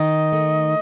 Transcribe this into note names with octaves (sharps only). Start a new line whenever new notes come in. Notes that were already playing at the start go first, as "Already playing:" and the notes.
Already playing: D#3 D#5
A3